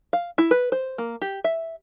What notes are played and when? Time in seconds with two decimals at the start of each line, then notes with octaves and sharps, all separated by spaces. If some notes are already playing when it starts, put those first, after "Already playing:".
0.13 F5
0.38 E4
0.51 B4
0.72 C5
0.98 A#3
1.22 G4
1.44 E5